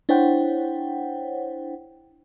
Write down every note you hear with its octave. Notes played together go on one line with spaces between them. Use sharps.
D4 E4 C5 C#5 F#5 G5